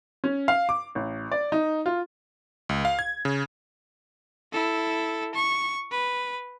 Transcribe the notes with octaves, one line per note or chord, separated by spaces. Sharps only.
C#4
F5
D6
A1
D5
D#4
F4
C#2
F5
G#6
C#3
E4 A4
C#6
B4